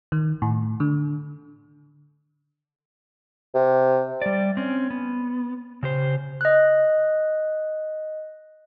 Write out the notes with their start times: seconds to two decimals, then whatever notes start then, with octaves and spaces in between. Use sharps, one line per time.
0.12 D#3
0.42 A2
0.80 D3
3.54 C3
4.22 G3 D5
4.57 C4 C#4
4.90 B3
5.83 C#3 G4 C5
6.41 D#5 F#6